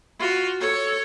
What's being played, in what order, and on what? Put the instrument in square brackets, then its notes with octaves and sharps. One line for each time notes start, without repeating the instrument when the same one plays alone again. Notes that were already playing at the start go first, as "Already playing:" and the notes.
[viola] F4 F#4
A4 C#5